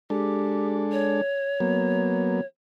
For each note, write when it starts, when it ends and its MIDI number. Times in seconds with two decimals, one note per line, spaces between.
0.10 1.21 56
0.10 1.21 62
0.10 0.82 67
0.10 1.21 69
0.92 2.46 73
1.60 2.41 54
1.60 2.41 58
1.60 2.41 59